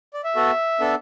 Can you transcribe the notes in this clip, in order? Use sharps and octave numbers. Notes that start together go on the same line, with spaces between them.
D5
E5
B3 F#4 A4
B3 D4 A4